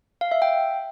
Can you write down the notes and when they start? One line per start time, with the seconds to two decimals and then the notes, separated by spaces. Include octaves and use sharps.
0.21 F5
0.31 E5
0.42 G5